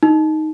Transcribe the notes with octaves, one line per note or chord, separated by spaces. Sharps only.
D#4